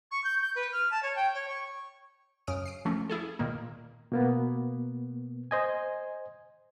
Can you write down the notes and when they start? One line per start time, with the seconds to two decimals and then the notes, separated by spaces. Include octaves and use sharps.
0.11 C#6
0.24 G6
0.41 G6
0.55 B4
0.72 F6
0.91 A5
1.02 C#5
1.15 G5
1.34 C#5
1.47 C#6
2.47 F#2 C#3 D#6 F6 D7
2.66 C7 D7
2.85 F3 A3 A#3 C#4
3.09 E4 G#4 A4
3.39 A#2 D#3 A#3
4.12 B2 A#3 B3
5.51 C5 D#5 G#5